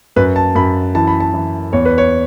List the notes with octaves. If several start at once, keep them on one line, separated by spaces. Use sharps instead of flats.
F#2 B4
A5
F#2 B5
E3 A5
B5
A5
E3
E2 C#5
B4
C#5